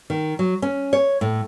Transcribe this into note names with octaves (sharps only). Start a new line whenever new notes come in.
D#3
F#3
C#4
C#5
A2